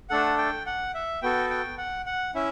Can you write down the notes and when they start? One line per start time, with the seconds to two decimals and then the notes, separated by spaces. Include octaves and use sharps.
0.10 A3 D4 A4 F#5
0.38 G5
0.66 F#5
0.94 E5
1.22 B3 F#4 A4 G5
1.50 G5
1.78 F#5
2.06 F#5
2.35 C#4 E4 E5